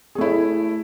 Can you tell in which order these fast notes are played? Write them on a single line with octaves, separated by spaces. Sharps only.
G#4 A3 E4